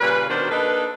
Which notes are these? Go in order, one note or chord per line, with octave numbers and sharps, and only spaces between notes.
A#2 C#3 G3 B4
B2 D#3 D4 F#4 A#4 C5
A#3 D4 D#4 A4 B4